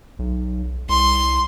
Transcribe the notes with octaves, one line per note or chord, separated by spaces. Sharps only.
B1
C2 C6